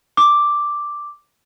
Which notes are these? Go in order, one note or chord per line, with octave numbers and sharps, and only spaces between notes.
D6